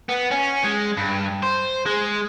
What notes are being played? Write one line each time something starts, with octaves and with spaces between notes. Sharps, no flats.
B3
C#4
G#3
G2
C5
G#3